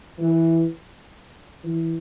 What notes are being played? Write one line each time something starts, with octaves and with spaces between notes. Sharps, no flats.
E3
E3